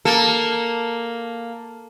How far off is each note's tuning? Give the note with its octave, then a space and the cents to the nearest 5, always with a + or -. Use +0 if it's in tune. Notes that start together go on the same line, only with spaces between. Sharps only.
A#3 +0 A4 +0